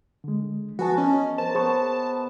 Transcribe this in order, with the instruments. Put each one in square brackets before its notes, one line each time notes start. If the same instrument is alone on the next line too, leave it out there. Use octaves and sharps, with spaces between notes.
[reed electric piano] D3 G#3
[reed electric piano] F3 B4 [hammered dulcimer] B3 G#4 A5 [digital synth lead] F#4
[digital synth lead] C#4 [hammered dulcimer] C#5 D#5
[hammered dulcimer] A#4 [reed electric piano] C5 [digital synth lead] A5
[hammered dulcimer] B3 [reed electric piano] G#4 C5 C#6